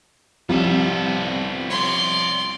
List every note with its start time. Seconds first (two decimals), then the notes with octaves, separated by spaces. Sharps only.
0.49 C2 F3 G3 B3 C#4 A4
1.70 C#5 D5 C6